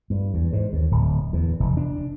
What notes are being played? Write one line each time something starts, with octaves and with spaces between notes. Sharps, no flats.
G2
E2
G#2
D#2
D1
E2
F1
D4